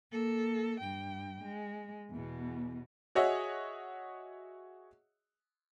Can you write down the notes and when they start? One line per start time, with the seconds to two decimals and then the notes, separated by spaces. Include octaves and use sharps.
0.12 A#3 A4
0.81 G2 G5
1.44 G#3
2.11 E2 B2
3.15 F#4 G#4 C#5 D#5 E5 F#5